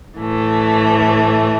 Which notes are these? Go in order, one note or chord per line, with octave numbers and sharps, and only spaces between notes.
A2 E3 A3